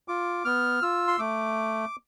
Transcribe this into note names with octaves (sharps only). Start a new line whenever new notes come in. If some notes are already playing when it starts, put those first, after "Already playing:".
F4 D6
B3 F6
F4 E6
C6
A3 D6